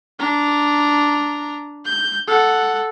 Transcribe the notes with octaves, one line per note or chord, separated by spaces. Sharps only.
D4 A#5
G6
A4 F#5